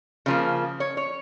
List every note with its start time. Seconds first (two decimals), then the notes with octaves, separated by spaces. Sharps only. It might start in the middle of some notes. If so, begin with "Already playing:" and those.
0.26 C#3 F3 A#3
0.80 C#5
0.97 C#5